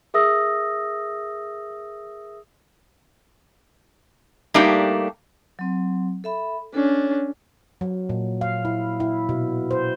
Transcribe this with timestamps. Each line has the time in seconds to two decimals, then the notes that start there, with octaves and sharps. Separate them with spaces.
0.14 G#4 A#4 E5 D#6 E6 A#6
4.54 G3 A3 A#3 D4 D#4 G4
5.59 F#3 C4
6.24 A4 E5 B5
6.74 C#4 D4 A4 C#5
7.81 F#3
8.09 A#2
8.41 F5
8.65 E4
9.00 E4
9.29 B2
9.71 C5